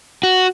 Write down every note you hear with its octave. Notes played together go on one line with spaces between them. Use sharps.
F#4